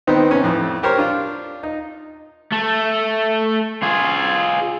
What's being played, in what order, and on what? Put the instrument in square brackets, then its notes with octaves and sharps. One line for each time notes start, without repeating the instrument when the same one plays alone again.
[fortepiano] D#3 B3 C4 D#4
C3 B3 C#4
F2 A2
G4 A#4 C5 C#5
D4 F4
D#4
[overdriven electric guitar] A3
F4 G#4